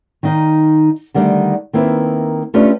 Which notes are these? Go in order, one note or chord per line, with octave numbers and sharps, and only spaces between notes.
D#3 D#4 F5
D3 D#3 G3 A3 C4 D4
D#3 A#3 C4 E4 B4
A3 C#4 D4 F4 G4 B4